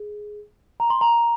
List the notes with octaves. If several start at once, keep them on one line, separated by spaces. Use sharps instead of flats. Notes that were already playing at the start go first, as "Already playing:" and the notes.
Already playing: G#4
A#5
C6
A#5